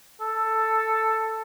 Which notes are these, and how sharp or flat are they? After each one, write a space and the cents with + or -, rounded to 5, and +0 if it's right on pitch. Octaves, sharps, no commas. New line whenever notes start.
A4 +5